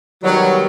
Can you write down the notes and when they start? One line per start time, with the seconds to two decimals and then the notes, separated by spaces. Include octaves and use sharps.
0.22 D#3 F#3 G3 B3 D#4 F#4